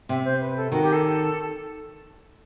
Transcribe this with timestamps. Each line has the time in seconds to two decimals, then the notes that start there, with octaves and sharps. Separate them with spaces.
0.09 C3 E5
0.24 C5
0.40 B4
0.56 A4
0.72 D#3 F#4
0.82 G4
0.92 A4